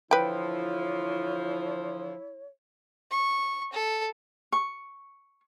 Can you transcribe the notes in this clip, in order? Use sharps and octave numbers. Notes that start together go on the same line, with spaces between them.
D3 E3 F3 E4 B4 C#5 G5
C#6
A4
C#6